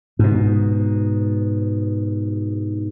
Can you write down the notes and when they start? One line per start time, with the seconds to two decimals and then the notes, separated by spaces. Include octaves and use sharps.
0.19 G#2 B2